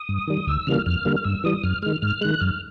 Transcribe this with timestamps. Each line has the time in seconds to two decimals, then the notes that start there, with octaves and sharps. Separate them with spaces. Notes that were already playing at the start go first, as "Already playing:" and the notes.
Already playing: D#6
0.09 G2
0.27 D#3 G3
0.47 D2 E6
0.67 C#3 E3 G3 A#3 F6
0.86 F2 F6
1.05 D3 G3 A#3
1.17 F6
1.24 G2 E6
1.44 E3 G3 D#6
1.63 F#2 F6
1.82 D#3 G#3 F6
2.02 G#2 F6
2.21 D#3 G#3 F#6
2.41 F#2 F6